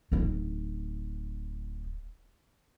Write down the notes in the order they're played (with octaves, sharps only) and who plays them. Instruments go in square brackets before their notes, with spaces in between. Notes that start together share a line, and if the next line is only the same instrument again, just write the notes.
[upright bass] D1 D#4